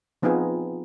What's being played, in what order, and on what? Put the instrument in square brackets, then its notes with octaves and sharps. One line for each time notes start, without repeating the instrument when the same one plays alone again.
[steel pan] F3 B3 C4 D#4 F4 G#4